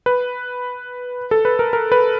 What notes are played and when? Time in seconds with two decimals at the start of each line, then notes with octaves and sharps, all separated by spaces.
0.06 B4
1.31 A4
1.45 B4
1.59 A#4
1.73 A#4
1.92 B4